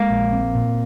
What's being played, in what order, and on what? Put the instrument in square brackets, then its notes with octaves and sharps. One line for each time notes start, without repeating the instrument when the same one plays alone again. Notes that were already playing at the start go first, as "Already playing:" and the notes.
Already playing: [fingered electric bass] G#3 [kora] A#3
[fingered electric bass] A#1
C4
A#2